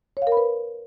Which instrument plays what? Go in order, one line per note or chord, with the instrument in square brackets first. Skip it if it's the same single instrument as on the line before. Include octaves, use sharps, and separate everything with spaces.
[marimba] C#5
F5
A#4
B5
B4